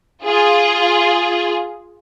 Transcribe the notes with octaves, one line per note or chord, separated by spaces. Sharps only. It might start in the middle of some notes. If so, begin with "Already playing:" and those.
F4 G#4